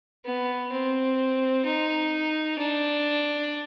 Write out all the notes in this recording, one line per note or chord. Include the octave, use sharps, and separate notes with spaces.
B3
C4
D#4
D4